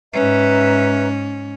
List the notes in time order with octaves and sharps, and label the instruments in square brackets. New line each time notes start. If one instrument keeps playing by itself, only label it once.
[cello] G#2 C#4 [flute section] B4 E5 A#5